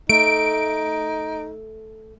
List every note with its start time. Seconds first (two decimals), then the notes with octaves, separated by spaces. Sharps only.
0.09 A3 D#4 D7